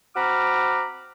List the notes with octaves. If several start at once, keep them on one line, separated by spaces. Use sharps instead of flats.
C4 F#4 A#5 B5 D6 F6